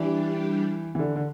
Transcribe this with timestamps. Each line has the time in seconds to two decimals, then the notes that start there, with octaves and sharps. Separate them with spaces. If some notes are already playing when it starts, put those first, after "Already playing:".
Already playing: E3 G3 D4 G4
0.95 E3
0.99 D3
1.16 D3